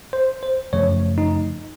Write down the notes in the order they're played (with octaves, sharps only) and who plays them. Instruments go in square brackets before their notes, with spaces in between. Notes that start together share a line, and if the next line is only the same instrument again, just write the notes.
[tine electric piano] C5
C5
F#2 C#3 F3 A3 C#5
D#4